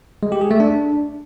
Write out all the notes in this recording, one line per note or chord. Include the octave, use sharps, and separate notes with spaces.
G#3
G4
G#4
A3
D4